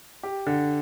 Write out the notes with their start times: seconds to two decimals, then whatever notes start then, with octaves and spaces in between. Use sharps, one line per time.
0.23 G4
0.46 D3